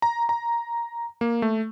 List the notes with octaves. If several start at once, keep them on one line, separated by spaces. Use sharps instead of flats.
A#5
A#5
A#3
A3